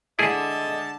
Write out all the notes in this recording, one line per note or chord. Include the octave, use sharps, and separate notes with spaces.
D3 G#3 A3 E4 G#4 D#5 A5